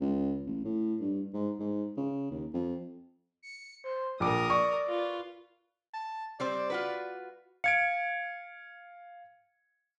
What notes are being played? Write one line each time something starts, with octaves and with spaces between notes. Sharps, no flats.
C#2
A1
A2
G2
G#2
G#2
C#3
D#2
F2
C#7
C5
A#1 A#2 A#4 D6 D#6
D5 C#6
F4 B4
A5
G3 C4 C5 D5
F4 F#4 B4
F5 G#6 C#7 D7